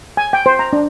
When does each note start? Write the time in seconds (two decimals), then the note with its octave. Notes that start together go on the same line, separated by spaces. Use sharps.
0.17 G#5
0.33 G5
0.46 C5
0.59 A#5
0.73 D4